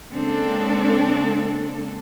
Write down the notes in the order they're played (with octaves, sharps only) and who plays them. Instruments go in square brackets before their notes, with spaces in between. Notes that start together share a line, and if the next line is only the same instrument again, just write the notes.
[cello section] C#3 G#3 A#3 C4 D4 A4